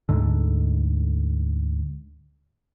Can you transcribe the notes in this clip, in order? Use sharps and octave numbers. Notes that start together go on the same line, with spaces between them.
D2 G#2 D3